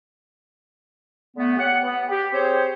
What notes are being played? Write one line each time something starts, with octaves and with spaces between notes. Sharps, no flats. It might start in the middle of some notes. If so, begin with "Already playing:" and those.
D3 A3 B3
G4 C#5 F#5
B3
G4
C4 G#4 C5 C#5